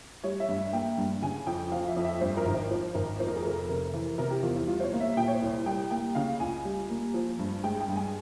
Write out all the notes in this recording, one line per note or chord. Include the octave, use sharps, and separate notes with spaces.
G3 C#5
E5
G2
E5
A#3 G5
G2
C#3 G#5
F2 G5
F3 F5
E5
F2
E5
G2 C5
A#4
G#1
C5
F3 C5
G#1 A#4
F2 C5
A#4
G#4
F1 A#4
C3
E3
C3 A#4
G4
E2 F4
E4
G3 F4
C5
C#5
A#3 F5
E5
A#2 G5
C#5
C5
C2
G3 G5
A#3 G5
C#3 F5
C#2 G#5
G3
A#3
F3
G2
G#3 G5
G5
G2
G#5